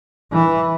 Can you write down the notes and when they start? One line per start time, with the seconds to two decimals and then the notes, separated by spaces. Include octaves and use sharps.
0.32 E3